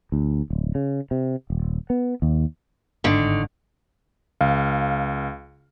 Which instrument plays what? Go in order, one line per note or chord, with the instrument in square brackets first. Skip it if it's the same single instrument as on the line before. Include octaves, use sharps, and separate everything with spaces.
[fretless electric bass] D2
D1
C#3
C3
D#1
B3
D#2
[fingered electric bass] G1 G#2 [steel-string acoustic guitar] D3 D#3
[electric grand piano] C#2 F5